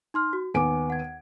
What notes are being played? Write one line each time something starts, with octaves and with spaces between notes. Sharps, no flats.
D#4 C6 F6
F#4
D#2 B3 G#5 D6 D7
F#5 G#6